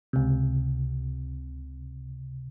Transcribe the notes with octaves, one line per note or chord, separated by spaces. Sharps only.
C#2 C3